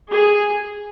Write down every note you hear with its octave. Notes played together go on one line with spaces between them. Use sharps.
G#4